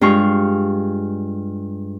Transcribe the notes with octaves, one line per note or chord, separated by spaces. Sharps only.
G2 G#3 F4 C#6